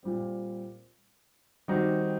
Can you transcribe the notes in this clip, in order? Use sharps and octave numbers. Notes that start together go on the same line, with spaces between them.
A#2 G3 C4
D#3 G3 C4 D#4 F#4